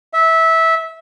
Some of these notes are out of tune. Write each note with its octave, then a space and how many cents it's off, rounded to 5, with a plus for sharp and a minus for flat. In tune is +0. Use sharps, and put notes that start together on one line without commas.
E5 -15